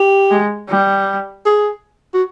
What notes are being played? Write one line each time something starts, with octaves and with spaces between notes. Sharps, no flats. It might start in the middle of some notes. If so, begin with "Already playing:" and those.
Already playing: G4
G#3
G3
G#4
F#4